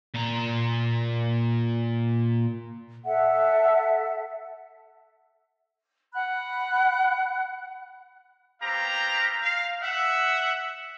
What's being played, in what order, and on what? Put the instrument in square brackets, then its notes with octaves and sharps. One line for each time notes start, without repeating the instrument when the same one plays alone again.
[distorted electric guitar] A#2 A#5
[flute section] A4 E5 F#5
F#5 B5 F#6
[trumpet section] B3 C4 G4 F5 A#5
F5
E5 F#5